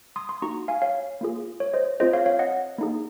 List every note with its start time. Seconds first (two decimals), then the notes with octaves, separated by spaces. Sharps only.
0.16 C6 D#6
0.29 C6 D#6
0.42 A#3 D#4 F#4 A#5 C#6
0.68 F5 G#5
0.82 C#5 F5
1.21 A#3 F4 G#4
1.60 C#5
1.74 C5 D#5
2.00 C4 F4 G#4 C5 D#5
2.13 C#5 F5
2.26 C#5 F5
2.39 D#5 F#5
2.78 A#3 D#4 G#4